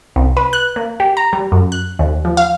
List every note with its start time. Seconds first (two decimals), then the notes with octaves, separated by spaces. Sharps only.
0.16 C2
0.37 B4
0.53 F#6
0.76 A#3
1.00 G4
1.17 A#5
1.33 G3
1.52 F#2
1.72 F#6
1.99 D#2
2.25 F3
2.37 F5